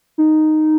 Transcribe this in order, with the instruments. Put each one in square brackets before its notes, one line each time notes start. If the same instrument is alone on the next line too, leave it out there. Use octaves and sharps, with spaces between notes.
[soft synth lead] D#4